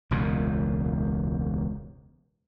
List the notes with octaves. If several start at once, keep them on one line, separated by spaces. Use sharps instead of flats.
E1 C#2 F#2 A#2